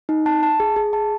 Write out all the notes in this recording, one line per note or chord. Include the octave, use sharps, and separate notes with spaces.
D#4
A5
A5
G#4
G#4
A5